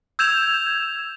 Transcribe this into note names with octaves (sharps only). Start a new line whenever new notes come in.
E6 G6 G#6 E7 F7